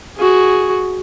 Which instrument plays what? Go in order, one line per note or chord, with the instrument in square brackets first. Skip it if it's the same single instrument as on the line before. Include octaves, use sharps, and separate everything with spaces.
[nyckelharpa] F#4 G#4